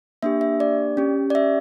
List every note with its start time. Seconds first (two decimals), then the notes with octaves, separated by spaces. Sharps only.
0.23 A#3 D4 G4 E5
0.41 E5
0.60 D5
0.97 C#4 G4
1.30 D5
1.35 E5